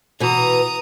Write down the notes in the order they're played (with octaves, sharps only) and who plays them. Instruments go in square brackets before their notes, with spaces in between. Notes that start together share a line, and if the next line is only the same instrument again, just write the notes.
[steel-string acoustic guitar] B2 E3 [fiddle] A#5 D#6